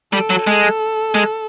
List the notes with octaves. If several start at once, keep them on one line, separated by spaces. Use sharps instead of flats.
G3 A4
F#3
G#3
G#3